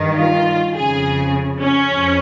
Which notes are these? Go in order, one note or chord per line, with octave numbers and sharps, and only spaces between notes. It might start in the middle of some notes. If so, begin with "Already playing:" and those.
Already playing: G2 D#3
F4
F2 C#3 G#4
C#4
F2